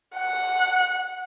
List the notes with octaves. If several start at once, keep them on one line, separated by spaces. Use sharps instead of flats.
F#5